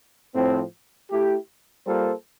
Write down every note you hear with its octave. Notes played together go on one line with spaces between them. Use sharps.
A2 F3 C4
A3 E4 G4
G3 A#3 F4 A4 C5